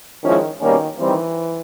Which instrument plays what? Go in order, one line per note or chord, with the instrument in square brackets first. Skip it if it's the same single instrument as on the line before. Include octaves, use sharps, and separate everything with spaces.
[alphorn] D#3 [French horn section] F3 G#3 C#4 E4
[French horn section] B2 G3 A#3 C#4 [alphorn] D#3
[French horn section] D#3 G3 C4 [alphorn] E3